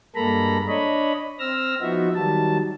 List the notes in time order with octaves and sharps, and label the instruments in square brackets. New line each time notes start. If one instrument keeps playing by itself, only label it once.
[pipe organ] G2 G#3 A#3 A4 A#5 B5
D4 C#5 D#5 B5
C4 E6 F6 A#6
F3 B3 D#4 F#4 E5
D#3 F#3 G3 A5